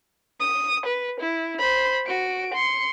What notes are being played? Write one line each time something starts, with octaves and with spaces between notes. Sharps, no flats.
D#6
B4
E4
C5 B5
F#4 D7
C6 C#7